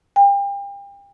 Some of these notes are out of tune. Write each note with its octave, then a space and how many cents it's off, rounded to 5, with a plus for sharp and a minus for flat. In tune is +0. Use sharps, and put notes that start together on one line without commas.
G5 +35